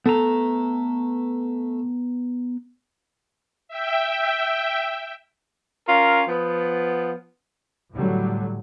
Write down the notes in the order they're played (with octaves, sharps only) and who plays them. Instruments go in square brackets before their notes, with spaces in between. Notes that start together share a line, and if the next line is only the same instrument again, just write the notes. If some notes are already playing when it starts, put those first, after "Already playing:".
[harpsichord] A3 [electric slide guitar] B3 A#5
[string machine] E5 G5
[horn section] C#4 F4 A#4
F3 B3
[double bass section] A2 D3 F#3 G3